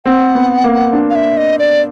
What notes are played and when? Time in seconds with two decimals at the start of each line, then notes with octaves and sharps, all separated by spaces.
0.05 C4 F#5
0.35 B3
0.64 A#3
0.93 D4
1.10 F5
1.15 E5
1.37 D#5
1.59 D5